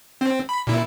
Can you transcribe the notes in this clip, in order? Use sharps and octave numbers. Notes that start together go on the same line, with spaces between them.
C4
B5
A#2 E4